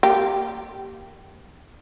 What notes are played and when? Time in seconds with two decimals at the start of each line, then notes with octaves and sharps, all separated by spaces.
0.03 A#3 G4